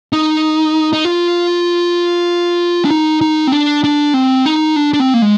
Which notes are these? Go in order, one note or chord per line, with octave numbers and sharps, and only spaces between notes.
D#4
D#4
F4
D4
D#4
D#4
C4
D4
D4
C4
D#4
D4
D4
C4
A#3
G#3